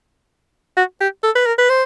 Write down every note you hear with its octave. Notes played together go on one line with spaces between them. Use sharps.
F#4
G4
A4
B4
A#4
B4
C5